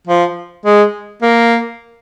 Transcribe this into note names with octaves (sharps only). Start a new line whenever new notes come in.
F3
G#3
A#3